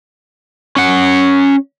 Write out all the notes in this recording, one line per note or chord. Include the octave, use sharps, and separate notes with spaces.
C#4 F#5